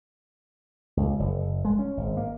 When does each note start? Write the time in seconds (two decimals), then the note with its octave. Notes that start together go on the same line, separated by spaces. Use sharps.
0.97 C#2
1.20 F#1
1.65 G#3
1.79 C#4
1.97 G#1
2.17 A#3